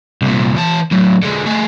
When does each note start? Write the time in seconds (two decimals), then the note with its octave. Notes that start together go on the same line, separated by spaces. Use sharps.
0.22 C2 A#2
0.56 E3 A5
0.91 A2 F#3
1.23 D3 G#3
1.46 A3 G#4